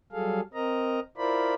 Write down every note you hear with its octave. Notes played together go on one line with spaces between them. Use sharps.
F#3 G3 G#4 A4 F5
C4 A#4 D#5 A#5
E4 F4 A#4 C5 D5 B5